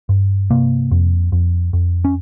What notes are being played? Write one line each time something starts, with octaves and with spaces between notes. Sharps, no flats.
G2
C3 A#3
F2
F2
F2
C#4